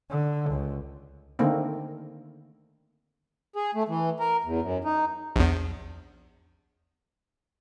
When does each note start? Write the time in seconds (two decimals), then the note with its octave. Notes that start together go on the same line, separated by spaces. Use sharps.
0.10 D3
0.50 C#2
1.39 D3 D#3 A3 A#3 C4
3.56 G#4
3.75 A3
3.89 E3
4.20 A#4
4.44 E2
4.62 F#2
4.84 D#4
5.36 A#1 E2